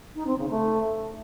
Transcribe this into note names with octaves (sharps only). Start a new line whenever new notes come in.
D#4
C4
C#3
A3